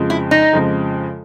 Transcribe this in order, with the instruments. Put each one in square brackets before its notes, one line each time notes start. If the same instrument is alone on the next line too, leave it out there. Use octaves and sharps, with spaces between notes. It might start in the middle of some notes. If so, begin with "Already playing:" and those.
Already playing: [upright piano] F2 C#3 F3 G#3
[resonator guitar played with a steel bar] E4
D#4
[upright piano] F2 C#3 F3 G#3